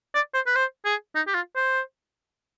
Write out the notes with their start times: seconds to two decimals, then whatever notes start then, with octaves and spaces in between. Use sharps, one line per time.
0.15 D5
0.34 C5
0.46 B4
0.55 C5
0.85 G#4
1.15 D#4
1.27 G4
1.34 F4
1.55 C5